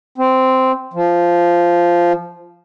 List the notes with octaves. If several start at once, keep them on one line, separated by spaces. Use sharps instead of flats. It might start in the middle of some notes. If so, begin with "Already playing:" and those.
C4
F3